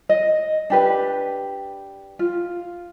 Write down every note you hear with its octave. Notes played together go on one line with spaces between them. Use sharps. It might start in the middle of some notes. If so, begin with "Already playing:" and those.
D#5
D4 G4 B4
F4